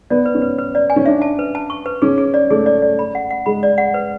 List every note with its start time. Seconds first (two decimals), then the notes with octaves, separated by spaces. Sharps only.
0.10 B3 D5
0.26 B4
0.35 C#4
0.42 B4
0.59 B4
0.75 D5
0.90 G#5
0.96 C#4
1.06 D4 E5
1.22 A5
1.39 B4
1.55 A5
1.70 C#6
1.86 B4
2.02 C#4 G#4
2.18 G#4
2.34 D5
2.51 A3 G#4
2.66 D5
2.82 D5
2.99 B5
3.15 F#5
3.30 F#5
3.46 G#3 B5
3.63 D5
3.78 F#5
3.94 B4